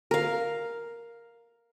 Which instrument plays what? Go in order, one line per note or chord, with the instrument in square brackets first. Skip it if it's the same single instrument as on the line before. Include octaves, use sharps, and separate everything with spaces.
[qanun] A#4 F5